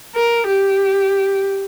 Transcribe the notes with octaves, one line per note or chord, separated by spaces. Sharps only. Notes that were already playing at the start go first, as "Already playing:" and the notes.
A#4
G4